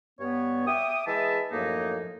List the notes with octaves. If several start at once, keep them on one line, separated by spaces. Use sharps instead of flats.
G2 B3 C#5
E5 G5 D6 D#6
E3 G#3 G#4 E5 A5
F#2 A2 F3 A#3 D#4